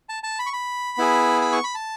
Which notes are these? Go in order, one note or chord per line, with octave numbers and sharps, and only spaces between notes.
A5
A5
B5
C#6
B5
B3 E4 G#4
B5
C#6
B5
A5